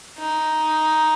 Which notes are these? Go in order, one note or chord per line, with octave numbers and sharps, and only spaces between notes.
D#4